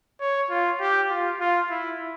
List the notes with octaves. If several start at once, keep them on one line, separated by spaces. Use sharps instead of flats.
C#5
F4
G4
F4
F4
E4